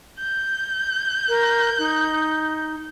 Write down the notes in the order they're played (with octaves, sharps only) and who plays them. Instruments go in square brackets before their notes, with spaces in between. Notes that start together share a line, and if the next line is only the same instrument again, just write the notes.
[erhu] G6
[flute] A#4
D#4